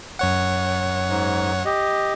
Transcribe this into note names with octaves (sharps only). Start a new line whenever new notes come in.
F#2 C#5 F#5
G#2
G4 D#5